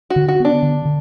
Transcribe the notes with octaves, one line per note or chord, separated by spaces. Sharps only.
F#4
D3
F#4
B3 D4
D3
D3